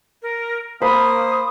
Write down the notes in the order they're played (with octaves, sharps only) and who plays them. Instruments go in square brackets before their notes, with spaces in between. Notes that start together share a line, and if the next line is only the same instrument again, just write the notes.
[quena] A#4
[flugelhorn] A#3 [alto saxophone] C5 [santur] B5 [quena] D#6